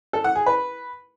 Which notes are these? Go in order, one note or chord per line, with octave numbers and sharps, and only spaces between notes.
A4
F#5
G#4
B4